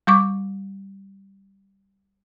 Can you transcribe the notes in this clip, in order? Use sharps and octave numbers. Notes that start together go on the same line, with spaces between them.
G3 C#6 D6